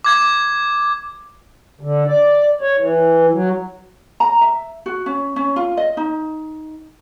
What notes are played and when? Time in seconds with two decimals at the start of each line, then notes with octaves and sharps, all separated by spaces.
0.04 D6 G#6
1.81 D3
2.07 D5
2.61 C#5
2.78 E3
3.32 F#3
4.20 A#5
4.41 E5
4.86 F#4
5.06 C#4
5.36 C#4
5.56 F4
5.77 D#5
5.97 D#4